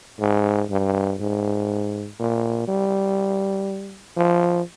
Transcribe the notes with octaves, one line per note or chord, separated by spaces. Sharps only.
G#2
G2
G#2
A#2
G3
F3